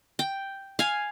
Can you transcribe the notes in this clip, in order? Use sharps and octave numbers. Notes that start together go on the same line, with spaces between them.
G5
F5 G#5